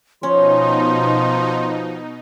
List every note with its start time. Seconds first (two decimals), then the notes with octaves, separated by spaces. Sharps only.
0.23 B2 F3 C#4 D#4 C6